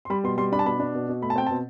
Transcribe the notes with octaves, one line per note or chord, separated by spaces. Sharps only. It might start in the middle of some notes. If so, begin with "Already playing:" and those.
C6
G3 B5
B2 C6
G3 C6
D4 B5
A5
B2 B5
D4
B2
B2
A3 B5
A5
C4 G5
B2 A5